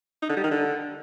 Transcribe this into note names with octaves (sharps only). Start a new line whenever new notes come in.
D#4
D3
G3
D#3
D3